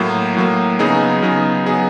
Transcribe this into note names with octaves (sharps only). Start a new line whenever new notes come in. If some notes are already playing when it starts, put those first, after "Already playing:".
Already playing: A2 F#3 A#3
A2 F#3 A#3
C#3 F#3 B3 D#4 G#4
C#3 F#3 B3 D#4 G#4
C#3 F#3 B3 D#4 G#4